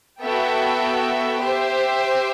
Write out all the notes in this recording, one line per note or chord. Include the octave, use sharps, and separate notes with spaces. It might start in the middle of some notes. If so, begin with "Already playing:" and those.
B3 F#4 A4 E5 G5
G4 C5 E5